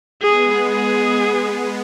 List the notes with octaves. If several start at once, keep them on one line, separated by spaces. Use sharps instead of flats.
G#3 B3 G#4
G#3 B3 G#4